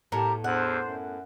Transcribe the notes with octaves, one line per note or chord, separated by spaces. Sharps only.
A2 B3 G4 A#4 A5
E2 D4 C5 F#5
F#2